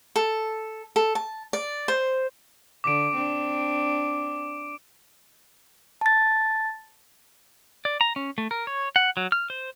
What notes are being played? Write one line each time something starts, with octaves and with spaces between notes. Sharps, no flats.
A4
A4
A5
D5
C5
D3 D6 D7
C4 D4
A5 A6
D5
A#5
C#4
A3
A#4
C#5
F#5
F#3
F6
C5